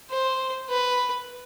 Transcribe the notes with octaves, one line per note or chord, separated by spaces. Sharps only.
C5
B4